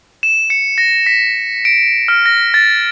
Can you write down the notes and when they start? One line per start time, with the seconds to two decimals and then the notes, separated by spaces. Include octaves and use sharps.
0.23 E7
0.50 C#7
0.78 A#6
1.06 B6
1.65 D7
2.08 F6
2.26 A#6
2.54 A6